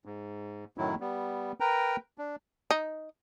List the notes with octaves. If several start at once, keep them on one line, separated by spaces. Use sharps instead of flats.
G#2
F#2 A2 D#3 F#3 E4
G3 B3
A#4 B4 G5 A#5
D4
D#4